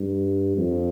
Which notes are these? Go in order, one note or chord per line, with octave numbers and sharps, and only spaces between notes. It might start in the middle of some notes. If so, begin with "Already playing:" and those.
Already playing: G2
F2